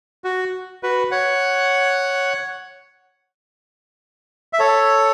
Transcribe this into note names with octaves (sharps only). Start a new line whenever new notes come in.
F#4
F#4 B4
C#5 F#5
E5
A4 C#5